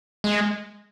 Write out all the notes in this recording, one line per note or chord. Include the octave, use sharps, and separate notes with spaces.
G#3